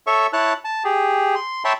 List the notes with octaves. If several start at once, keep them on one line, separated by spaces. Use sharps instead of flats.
A4 C#5 E5 C#6
E4 C#5 A5 F#6
A5
G4 G#4
C6
C#5 E5 G5 A5 B5 C6